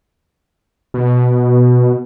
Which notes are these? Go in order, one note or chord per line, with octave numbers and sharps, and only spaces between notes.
B2